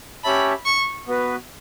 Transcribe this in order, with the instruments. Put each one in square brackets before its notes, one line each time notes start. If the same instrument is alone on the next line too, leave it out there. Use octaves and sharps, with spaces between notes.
[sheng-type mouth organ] C#4 G4 C#5 E5 A5 [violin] B5
[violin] C#6
[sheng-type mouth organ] B3 F#4 B4